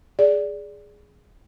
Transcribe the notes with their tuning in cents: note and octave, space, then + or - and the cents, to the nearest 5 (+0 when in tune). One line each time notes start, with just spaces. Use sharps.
G#4 +0 D5 -10